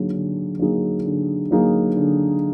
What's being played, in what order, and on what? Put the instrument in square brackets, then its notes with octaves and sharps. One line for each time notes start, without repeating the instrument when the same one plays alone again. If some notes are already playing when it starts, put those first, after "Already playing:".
Already playing: [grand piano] D3 F#3 A#3 D#4 G#4
D3
F#3 A#3 D#4 G#4
D3
F#3 A#3 D#4 G#4
D3